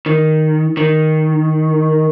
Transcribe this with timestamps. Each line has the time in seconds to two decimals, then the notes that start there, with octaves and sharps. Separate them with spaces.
0.06 D#3
0.77 D#3